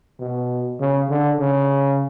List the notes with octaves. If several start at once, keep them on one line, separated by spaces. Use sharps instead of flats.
B2
C#3
D3
C#3